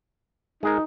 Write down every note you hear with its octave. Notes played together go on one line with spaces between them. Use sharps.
G#3 D#4 G#4 A#4